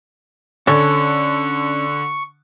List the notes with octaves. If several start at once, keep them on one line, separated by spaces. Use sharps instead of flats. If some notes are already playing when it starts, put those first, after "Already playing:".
D3 C#4 A4 C#5 C#6